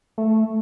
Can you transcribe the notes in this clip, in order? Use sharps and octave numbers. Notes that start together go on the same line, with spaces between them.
A3